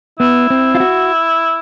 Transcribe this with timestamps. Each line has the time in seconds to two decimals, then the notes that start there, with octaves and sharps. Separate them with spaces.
0.20 B3 E4
0.50 C4
0.75 F4
0.80 F#4